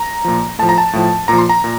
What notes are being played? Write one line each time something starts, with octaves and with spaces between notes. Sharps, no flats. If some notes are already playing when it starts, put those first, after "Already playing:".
Already playing: A#5
A#2 F3
A2 F3 A5
A#5
A5
A2 F3
A#2 F3 A#5
C6
A#5
A#2